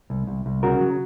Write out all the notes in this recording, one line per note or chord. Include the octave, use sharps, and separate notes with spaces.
C2
C2
C2
C#3 F#4 A#4
F#3